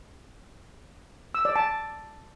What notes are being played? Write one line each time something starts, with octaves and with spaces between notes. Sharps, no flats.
E6
D5
A5